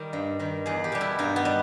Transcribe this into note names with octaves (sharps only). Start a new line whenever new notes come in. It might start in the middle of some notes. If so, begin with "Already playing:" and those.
Already playing: D#3 G3 A#4
G2
D#3 G3
E2 G#4
G4
B2 G3
E4
G2 D#4
B3
G3